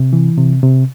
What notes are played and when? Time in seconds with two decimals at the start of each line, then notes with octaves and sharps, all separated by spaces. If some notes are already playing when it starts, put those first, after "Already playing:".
Already playing: C3
0.13 E3
0.37 C3
0.63 C3